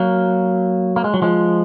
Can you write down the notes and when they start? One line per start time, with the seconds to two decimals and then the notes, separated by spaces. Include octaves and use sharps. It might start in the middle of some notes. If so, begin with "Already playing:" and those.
Already playing: F#3 A#3
0.96 A#3
1.04 G#3
1.14 F#3
1.22 F3 G#3